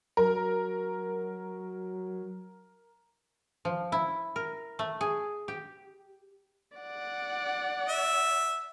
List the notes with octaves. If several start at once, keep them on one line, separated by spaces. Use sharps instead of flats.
F#3 A#4
F3
E4
A#4
A3
G#4
G4
D5 F#5
E5